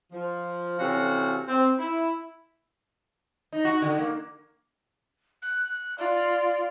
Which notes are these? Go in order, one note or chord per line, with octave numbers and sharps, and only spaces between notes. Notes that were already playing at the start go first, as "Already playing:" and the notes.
F3
C3 E3 C#4 F#4 A4 F5
C4
E4
D#4
F#4
D3
A#3
F#6
F4 D5